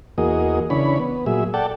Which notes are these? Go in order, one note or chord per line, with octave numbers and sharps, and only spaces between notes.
E2 A#3 F#4 G#4 D#5
C#3 E3 D4 C#5 B5
B3
A#2 F#3 G#4 E5
A4 D5 F#5 G5 A5